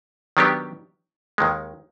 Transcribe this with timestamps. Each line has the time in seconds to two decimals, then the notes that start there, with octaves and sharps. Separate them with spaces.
0.37 D#3 F#3 B3 D4 G4
1.38 D#2 D#3 G#3